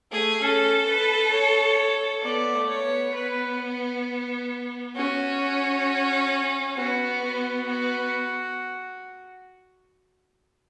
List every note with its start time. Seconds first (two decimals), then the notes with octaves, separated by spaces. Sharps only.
0.12 A3 G#4
0.41 C#4 A4
0.87 B4
1.33 C#5
2.23 B3 D5
2.54 A3
2.69 C#5
2.84 B3
3.14 B4
4.96 C#4 F#4
5.40 F#4
6.77 B3 F#4
7.22 F#4
7.66 B3